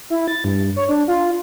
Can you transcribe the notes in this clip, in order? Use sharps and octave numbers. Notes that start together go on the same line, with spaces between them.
E4
A6
G2
C#5
D4
F4